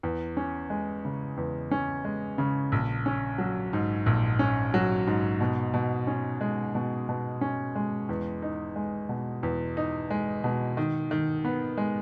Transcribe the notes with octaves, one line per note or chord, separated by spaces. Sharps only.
E2
C#4
G#3
C#3
E2
C#4
G#3
C#3
A#1
C#4
F#3
G#2
A#1
C#4
F#3
G#2
B2
B2
C#4
G#3
B2
B2
C#4
G#3
E2
D#4
G#3
B2
E2
D#4
G#3
B2
D#3
D#3
B3
G#3